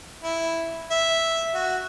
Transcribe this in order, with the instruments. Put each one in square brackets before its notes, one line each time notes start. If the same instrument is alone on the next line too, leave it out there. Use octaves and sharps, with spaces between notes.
[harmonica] E4
E5
F#4